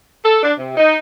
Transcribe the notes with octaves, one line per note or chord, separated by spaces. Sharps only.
A4
D4
C3
D#4